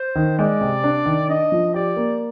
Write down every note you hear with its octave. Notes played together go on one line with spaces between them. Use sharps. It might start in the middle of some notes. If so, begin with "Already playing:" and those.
Already playing: C5
D#3
G#3 D5
C3
D4
D#3
D4 D#5
F3
G4 D5
A#3